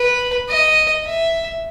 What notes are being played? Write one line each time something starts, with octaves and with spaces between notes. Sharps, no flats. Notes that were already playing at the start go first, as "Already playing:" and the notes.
Already playing: B4
D#5
E5